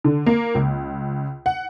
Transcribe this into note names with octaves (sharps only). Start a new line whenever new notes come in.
D3
A#3
C#2
F#5